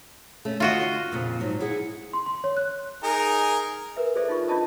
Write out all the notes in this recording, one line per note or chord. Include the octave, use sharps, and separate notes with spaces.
A3 C#4
D3 F4 F#4 D#5
F2 A#2 C#3
G#2 F#3
E4 G#4 F#5
C6
C6
C#5
F#6
D#4 G#4 A#4
A#4 B4 E5
G#4 A4 B4 C5 D5 E5
D#4 F4 C#6
C#4 D4 F4 D#5 A5 D#6